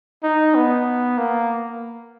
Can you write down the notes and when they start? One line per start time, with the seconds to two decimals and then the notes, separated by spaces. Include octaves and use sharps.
0.23 D#4
0.55 B3
1.18 A#3